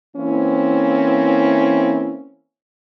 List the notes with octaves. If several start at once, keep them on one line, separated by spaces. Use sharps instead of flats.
E3 A#3 C4 C#4 E4